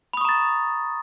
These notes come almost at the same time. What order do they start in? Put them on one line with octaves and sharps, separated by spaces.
B5 D#6 C#6 A#5 A6